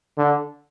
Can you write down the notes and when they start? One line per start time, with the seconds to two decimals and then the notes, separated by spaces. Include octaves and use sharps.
0.18 D3